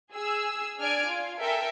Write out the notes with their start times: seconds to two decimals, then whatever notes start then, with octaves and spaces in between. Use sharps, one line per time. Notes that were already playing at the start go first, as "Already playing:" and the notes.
0.12 G#4 E6
0.78 D4 D5 G#5 F6 G#6 D7
1.08 F4
1.40 A4 A#4 E5 G5 G#5